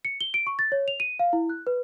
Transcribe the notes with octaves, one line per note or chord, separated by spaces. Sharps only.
C#7
G7
D7
C#6
A6
C#5
F7
D#7
F5
E4
F#6
B4